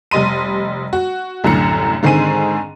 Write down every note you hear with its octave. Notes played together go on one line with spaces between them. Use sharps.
F1 G3 D#5 C6 D#7
F#4
C2 F#2 A2 D3 A#5 C#7
G#2 D3 D#3 C4 G#4 D#7